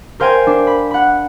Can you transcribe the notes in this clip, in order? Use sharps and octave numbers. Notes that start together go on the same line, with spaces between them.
A#4 C5 F5 G5 G#5
D4
B5
F#5 B5